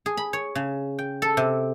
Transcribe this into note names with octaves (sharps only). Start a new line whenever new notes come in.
G#4
B5
C#5
C#3
G5
A4
C3